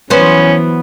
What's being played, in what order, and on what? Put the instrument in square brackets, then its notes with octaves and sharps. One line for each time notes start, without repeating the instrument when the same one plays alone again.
[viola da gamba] E3 F#3 [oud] B3 C5 [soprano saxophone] C#4